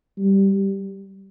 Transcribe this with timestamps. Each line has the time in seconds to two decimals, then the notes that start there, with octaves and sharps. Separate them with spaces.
0.18 G3